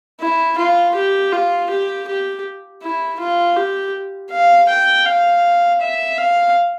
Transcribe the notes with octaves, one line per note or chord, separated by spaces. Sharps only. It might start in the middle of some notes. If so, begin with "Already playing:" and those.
E4
F4
G4
F4
G4
G4
E4
F4
G4
F5
G5
F5
E5
F5